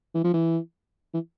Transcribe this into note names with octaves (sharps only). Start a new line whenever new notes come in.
E3
F3
E3
E3